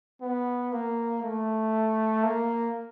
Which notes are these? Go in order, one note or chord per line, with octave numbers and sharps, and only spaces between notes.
B3
A#3
A3
A#3